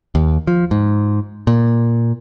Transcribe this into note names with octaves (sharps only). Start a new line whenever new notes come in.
D#2
F3
G#2
A#2